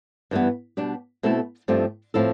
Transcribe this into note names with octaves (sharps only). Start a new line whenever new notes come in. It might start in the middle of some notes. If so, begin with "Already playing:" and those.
G2 E3 G3 B3
B2 G3 D4 G4
B2 A3 C4 E4 A4
G2 F3 A3 C4 G4
A2 F3 C4 E4 A4